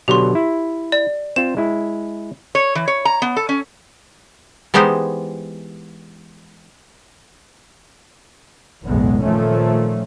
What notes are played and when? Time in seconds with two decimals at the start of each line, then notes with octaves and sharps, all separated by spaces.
0.08 B2 D3 F#3 G4 C6
0.35 E4
0.92 D5
1.36 C4 F4 E7
1.57 G#3 E4
2.55 C#5
2.75 E3
2.88 C#5
3.05 A#5
3.22 B3
3.36 A4
3.49 C#4
4.74 E3 G#3 B3 D#4 G4 C5
8.85 F#1 B1 E2 A2 G#3 B3
9.22 A#2 D#3 F3 A3 C#4